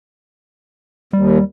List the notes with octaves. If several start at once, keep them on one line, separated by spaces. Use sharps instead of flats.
D#2 G3